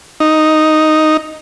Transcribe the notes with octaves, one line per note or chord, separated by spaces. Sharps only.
D#4